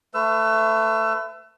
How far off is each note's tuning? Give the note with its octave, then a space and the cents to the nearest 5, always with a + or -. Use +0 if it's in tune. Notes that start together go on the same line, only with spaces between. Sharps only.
A3 +15 B4 +40 E6 +25